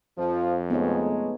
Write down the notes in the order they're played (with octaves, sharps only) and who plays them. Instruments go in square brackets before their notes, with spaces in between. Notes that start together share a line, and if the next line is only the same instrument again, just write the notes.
[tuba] F2 [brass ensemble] F3
[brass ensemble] G#3 A3 [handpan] B3 D#4 C#5